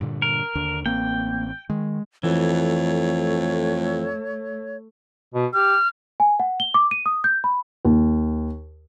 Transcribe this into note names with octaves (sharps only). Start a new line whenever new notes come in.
G2 A#2 D3
A#4
D#2 D3 D4
A1 A#3 C4 G5
D#3 G#3
F2 E3 A3 C#5
B2
G4 F6
G#5
F#5
G7
D6
D#7
D#6
G6
B5
D#2